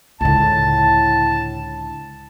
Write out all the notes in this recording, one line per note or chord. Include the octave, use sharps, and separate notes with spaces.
C#2 A2 D3 A5